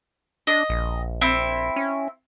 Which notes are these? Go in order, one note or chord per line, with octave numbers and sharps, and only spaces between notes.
D4 D#5
A#1
C4 E4
C#4